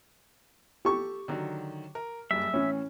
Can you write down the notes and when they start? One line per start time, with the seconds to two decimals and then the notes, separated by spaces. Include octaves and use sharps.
0.85 G4 A4 C#6
1.28 D3 D#3 F#3
1.95 A#4
2.31 F#1 G2 E5
2.54 A2 E3 C#4